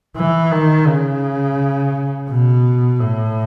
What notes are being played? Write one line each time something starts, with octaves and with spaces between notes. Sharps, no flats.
E3
D#3
C#3
B2
A2